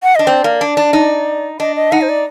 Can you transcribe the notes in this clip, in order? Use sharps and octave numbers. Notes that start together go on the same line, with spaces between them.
F#5
D4 D#5
C4 D5
A#3
D4
D4
D#4
D4 D#5
D#5
D#4 F#5
C5
D5